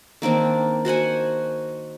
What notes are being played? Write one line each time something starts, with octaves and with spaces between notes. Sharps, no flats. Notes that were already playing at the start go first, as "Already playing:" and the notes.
D#3 A#3 C4 D4
F#4 C5 F#5 G#5